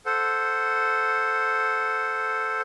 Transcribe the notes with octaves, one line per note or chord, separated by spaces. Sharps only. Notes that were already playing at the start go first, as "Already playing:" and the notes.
A4 C5 F#5